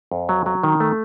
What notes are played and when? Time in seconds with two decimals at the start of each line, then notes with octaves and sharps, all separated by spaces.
0.12 F2
0.29 F#3
0.46 F#3
0.63 D#3
0.80 A3